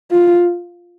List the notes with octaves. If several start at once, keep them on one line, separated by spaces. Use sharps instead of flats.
F4